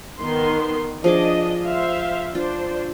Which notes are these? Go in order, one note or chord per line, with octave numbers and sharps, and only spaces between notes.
D#3 B3 C6
F3 D4 G#4 D#5 D6
C5 E5 F5
D4 F4 C5